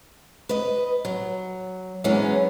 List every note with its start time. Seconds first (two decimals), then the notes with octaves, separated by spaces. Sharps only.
0.49 B4 D#5
1.05 F#3
2.04 E3 F#3 G#3 B3 C#4